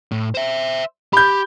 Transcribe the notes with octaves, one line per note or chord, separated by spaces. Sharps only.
A2
C5 E5
G4 B5 G6